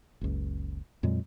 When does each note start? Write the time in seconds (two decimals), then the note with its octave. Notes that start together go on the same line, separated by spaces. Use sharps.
0.21 F#1 C#2
1.03 F2 A#2 F#3 G#3